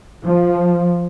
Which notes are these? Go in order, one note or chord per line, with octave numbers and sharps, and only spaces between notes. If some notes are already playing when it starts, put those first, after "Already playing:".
F3